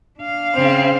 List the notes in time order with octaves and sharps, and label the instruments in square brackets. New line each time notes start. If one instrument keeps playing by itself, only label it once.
[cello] D4 F5
[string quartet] C#3 C4